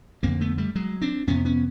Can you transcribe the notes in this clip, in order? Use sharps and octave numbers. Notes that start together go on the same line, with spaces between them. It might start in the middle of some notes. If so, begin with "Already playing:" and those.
F2 D3 A#3 C4
A3 B3
G3 A3
F#3 G#3
C4 D4
F2 C3 B3 C#4
B3 C#4